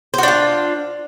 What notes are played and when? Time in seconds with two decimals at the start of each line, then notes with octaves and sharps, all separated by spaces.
0.14 C5
0.18 F#4
0.23 D4
0.28 F4